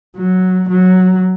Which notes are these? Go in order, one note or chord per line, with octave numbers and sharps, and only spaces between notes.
F#3
F#3